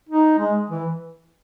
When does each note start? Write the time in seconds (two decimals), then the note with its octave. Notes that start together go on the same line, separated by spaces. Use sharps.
0.09 D#4
0.39 G#3
0.70 E3